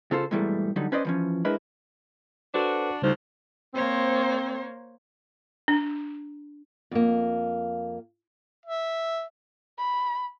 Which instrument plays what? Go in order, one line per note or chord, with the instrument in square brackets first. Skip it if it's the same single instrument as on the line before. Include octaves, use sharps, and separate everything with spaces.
[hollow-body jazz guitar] C#3 F4 A4 C5
G#2 B2 E3 G3 A3
D3 F#3 G3 D#4
C#4 B4 C5 D5 D#5
E3 F3 C#4
G#3 D4 E4 A#4 B4 D#5
[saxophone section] D4 F#4 [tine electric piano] A4 B4 C5
[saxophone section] D2 F4 C5 [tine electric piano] C#3 G3 D#4
[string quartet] A#3 C5 C#5 [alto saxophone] C4
[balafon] D4
[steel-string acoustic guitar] F2 A#3
[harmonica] E5
[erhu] B5